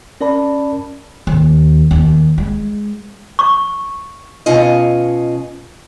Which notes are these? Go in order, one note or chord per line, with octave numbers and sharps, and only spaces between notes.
C#4 A#4 D5 A5 B5
D#2
D#2
G#3
C#6
B2 C#4 F4 D#5